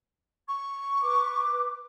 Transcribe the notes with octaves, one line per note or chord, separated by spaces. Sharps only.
C#6
B4 D6